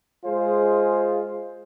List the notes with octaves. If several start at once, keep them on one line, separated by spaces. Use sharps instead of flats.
G#3 F4 G#4 C5